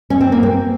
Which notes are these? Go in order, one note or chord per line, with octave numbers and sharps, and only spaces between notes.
C#4
C4
A#3
C4